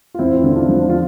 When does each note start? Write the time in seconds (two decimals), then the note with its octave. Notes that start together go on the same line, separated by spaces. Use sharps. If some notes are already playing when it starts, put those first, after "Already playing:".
0.14 F4
0.19 E2 C4 E4
0.44 D3
0.56 D4 F4
0.69 F3
0.89 F4